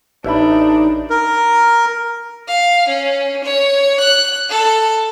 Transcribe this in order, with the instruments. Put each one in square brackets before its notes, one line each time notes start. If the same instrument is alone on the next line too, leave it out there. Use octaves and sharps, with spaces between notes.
[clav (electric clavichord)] A1 [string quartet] D4 [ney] D#4 [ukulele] A4 E5 B5
[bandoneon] A#4
[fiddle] F5
C#4
C#5
F#6
A4